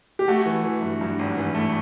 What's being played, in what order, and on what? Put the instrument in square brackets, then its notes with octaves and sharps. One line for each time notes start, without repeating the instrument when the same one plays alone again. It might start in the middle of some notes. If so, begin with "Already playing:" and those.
[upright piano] G4
[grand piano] A3 [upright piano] F#4
[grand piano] E3
E3
G2
G2
G#1
E3
A3